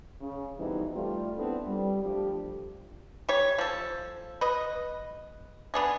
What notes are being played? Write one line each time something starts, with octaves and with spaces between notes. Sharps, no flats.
C#3
F2 B2 E3 G3 C4 D#4
G3 A3 F4
B3 C4 D4 E4 A4
G3
F3 A3 D4 G4
G3 C#5
F3 A4
B4 D#5
B3 D4 G#4